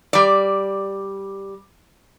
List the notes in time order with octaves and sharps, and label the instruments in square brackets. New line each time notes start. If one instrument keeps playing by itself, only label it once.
[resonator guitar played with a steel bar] G3 D5